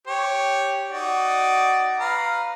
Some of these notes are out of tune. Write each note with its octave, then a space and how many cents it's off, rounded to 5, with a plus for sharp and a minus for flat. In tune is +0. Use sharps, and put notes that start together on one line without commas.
G4 +0 C#5 +0
D#4 +5 F#4 +20 D5 +0
B4 +0 F5 +0 A#5 +0